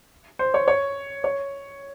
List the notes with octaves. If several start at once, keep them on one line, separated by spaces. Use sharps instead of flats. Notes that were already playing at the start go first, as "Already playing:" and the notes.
C5
C#5
C#5
C#5